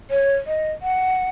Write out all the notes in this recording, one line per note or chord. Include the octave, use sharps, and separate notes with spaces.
C#5
D#5
F#5